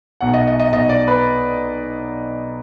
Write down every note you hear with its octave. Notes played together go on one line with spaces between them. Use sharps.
B1 B2 F#5
D#5
D#5
D#5
B1 B2 D#5
D5
B4